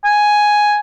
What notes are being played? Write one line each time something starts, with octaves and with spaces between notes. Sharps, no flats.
G#5